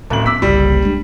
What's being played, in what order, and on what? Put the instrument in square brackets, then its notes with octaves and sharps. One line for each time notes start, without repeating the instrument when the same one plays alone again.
[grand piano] D1 A1 F#7 [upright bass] A2
[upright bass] B3 [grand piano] D6 E6 B6
[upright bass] F#1 C2 [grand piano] G3
[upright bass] G#3 D4